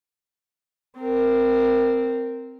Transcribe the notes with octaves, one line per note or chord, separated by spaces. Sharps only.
C4 A#4